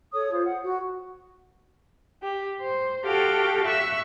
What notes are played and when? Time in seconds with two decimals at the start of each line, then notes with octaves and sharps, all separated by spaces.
0.13 A4 C#5 D#6
0.32 F4 C5
0.45 F#5
0.62 F#4
2.22 G4
2.60 C5
3.04 F#4 G4 A4 F5 G5
3.65 E5 C#6 E6 F#6